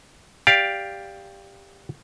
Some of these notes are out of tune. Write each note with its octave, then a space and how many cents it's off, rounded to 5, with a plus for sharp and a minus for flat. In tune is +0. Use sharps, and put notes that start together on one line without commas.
G4 +10 D5 +0 F5 +0